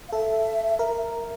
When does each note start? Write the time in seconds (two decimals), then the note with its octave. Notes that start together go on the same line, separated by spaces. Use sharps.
0.09 F5
0.12 A4 E5
0.79 A#4 E5